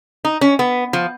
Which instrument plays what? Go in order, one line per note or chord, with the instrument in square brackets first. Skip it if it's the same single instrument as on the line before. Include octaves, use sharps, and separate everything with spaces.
[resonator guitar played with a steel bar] D#4
C#4
B3
F3